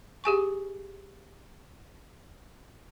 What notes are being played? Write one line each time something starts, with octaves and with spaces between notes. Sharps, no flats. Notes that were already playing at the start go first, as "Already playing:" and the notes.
G4 G#4 G#5 C#6